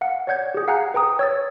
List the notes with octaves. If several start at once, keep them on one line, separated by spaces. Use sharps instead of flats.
F5 F#5
C#5 D5 F#5 G6 G#6
G4 G#4
F5 F#5 G#5 A#5 F#6 G6
B4 G5 A#5 D#6
C#5 E6 A6